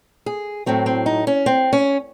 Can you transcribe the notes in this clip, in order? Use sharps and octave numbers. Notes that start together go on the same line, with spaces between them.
G#4
A2 F#3 C4
C4
D#4
C#4
C4
C#4